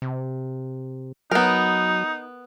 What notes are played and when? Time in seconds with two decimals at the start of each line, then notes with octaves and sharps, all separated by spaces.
0.02 C3
1.31 F#3 B3 D#4 A#4